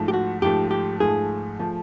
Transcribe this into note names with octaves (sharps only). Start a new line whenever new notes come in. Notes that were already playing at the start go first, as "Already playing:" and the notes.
Already playing: G#2 F3 A3
G4
F#4
G#2 F3 A3 G4
G4
G#2 F3 A3 G#4
F3 A3